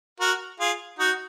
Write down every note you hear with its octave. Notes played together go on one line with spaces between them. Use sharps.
F#4 A#4
F4 G#4
D#4 F#4